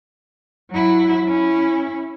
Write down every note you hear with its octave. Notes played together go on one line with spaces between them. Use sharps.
F#3 E4
C#4 E4